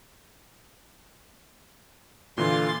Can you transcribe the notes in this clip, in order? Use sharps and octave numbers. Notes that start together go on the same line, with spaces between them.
A#2 D3 E3 F4 C6 A6